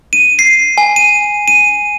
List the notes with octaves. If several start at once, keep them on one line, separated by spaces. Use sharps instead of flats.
D#7
C7
G#5
D#7
D#7